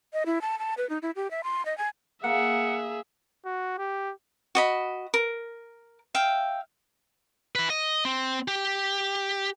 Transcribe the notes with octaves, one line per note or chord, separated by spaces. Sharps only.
D#5
E4
A5
A5
B4
D#4
E4
G4
E5
C6
D#5
G#5
A#3 G#4 E5 F#5 A#5
F#4
G4
F#4 D#5 B5
A#4
E5 F5 G5
E4 B4
D#5
C4
G4